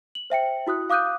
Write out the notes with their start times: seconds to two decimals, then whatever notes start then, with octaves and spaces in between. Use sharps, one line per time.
0.15 F#7
0.30 C5 E5 G5 C#7
0.67 E4 F#4 D#6 F#6
0.90 F5 D6 D#6 F#6 G6 D#7